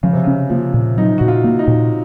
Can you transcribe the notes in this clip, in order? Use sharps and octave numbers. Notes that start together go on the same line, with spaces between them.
C#3 F3
C3
C#3
C#4
F3 A#3
A#2
F#3 D#4
A#2 F#4
F4
A#3
D#4
A#2